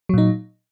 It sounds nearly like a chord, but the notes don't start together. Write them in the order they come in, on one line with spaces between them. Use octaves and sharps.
F#3 A#2 D#4